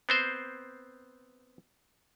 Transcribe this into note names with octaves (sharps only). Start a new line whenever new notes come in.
B3 C4 C5